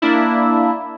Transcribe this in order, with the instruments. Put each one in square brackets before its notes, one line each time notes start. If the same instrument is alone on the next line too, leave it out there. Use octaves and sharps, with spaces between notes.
[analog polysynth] A#3 D4 E4